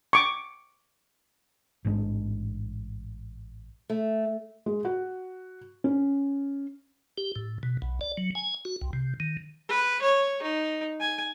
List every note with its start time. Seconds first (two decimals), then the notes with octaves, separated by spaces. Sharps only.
0.13 C#6 D6
1.85 A1 G#2 G#3 D4
3.90 A3
4.66 G#3
4.85 F#4
5.84 C#4
7.18 G4
7.36 A2
7.63 B2
7.82 B1
8.01 D5
8.17 F#3
8.35 G#5
8.65 F#4
8.82 C2
8.93 C3
9.20 D#3
9.69 B4
10.02 C#5
10.42 D#4
11.00 G#5